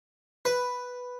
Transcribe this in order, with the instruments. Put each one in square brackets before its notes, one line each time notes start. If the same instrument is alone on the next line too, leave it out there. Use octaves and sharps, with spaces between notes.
[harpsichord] B4